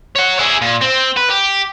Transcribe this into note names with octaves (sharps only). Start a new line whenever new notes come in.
C#5 F#5
E4 G#4
A#2
C4
B4
G4